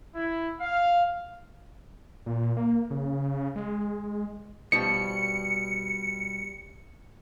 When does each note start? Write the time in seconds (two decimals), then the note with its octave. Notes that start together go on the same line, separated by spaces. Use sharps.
0.14 E4
0.59 F5
2.26 A#2
2.57 A#3
2.90 C#3
3.56 G#3
4.72 B2 F3 G3 C#7